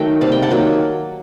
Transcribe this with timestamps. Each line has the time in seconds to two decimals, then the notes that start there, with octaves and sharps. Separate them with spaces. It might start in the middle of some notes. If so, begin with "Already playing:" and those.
Already playing: D#3 F#3 A3 D#5 G5
0.21 C3 G3 A#3 A5
0.32 G5
0.42 F#5 A5
0.50 D#3 F#3 A#3